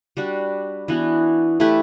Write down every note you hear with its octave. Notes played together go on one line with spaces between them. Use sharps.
G3 D4 F#4
E3 B3 D4 F#4
A3 E4 G4 B4